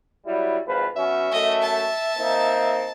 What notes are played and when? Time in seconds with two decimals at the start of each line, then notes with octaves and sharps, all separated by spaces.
0.25 F#3 G3 E4
0.67 G#1 F3 B4
0.96 F#3 B3 C#4 E5
1.32 F#2 A3 D#5
1.63 A5
2.17 A#3 C4 D#4